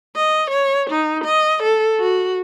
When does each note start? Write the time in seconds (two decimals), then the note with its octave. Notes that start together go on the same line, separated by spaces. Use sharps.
0.16 D#5
0.51 C#5
0.90 D#4
1.24 D#5
1.63 A4
2.00 F#4